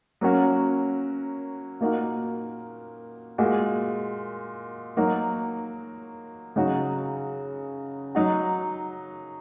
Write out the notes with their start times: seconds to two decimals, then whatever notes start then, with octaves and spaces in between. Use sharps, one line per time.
0.21 F#3 A#3 C#4 F#4
1.81 A#2 A#3 D#4 F#4
3.38 A#2 G#3 F#4
4.97 F#3 A#3 D#4 F#4
6.56 C#3 F#3 D#4 F#4
8.15 F#3 D#4 F#4